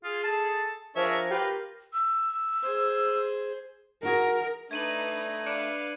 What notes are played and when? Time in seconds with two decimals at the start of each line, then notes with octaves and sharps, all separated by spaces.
0.04 F4 G#4
0.24 A4 A5
0.96 F3 D4 G#4 A#4 C#5 E5
1.31 F4 G4 B4
1.93 E6
2.63 G#4 C5
4.03 D#4 F#4 G#4 A#4
4.71 A3 D4 D#4 B4 G#6 D#7 F#7
5.46 D4 B4 F5 C#7